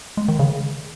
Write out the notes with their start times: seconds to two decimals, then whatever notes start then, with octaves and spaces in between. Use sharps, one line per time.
0.17 G#3
0.28 D#3
0.39 C#3